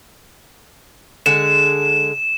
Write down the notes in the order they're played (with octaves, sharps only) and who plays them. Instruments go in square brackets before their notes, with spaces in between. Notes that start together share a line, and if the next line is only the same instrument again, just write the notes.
[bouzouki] D3 G#3 [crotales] E7